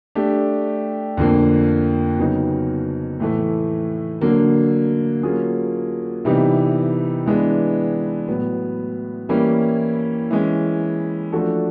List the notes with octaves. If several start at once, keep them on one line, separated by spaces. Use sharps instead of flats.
A3 D4 G4
F2 D3 F3 A#3
C#3 F#3 B3 D#4
A2 E3 A3
D3 F#3 A#3
F#3 A#3 C#4 F4 G#4
C3 E3 G3 B3 D#4
E3 G#3 B3 D4
A2 F#3 B3
E3 G3 A#3 C#4 E4
E3 G#3 C#4
F3 A3 D4 F#4 A4